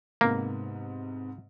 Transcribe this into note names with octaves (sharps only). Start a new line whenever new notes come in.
G#2 C3 A#3 B3